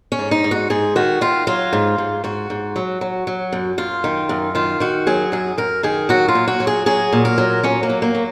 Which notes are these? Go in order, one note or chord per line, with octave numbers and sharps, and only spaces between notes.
C#4
G#2
D#4
G#2
F#4
G#2 G#4
D#3 F#4
D#3 F4
F#3 F4
G#2
G#2
G#2 F#4
G#2
F#3
F#3
F#3
F#2
F#2 F4
D#3
F#2
D#3 F4
D#3 F#4
F#3 G#4
F#2 G#4
F#2 A#4
D#3 G#4
F#3 F#4
F4
A#2
F#4
F#3
G#4
F#3 G#4
A#2
A#4
F#3
F#3 C#4
A#3
F#3
A#3
F#3